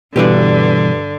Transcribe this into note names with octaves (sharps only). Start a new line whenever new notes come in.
G2 B2 D3 E3 G3 G4 B4 D5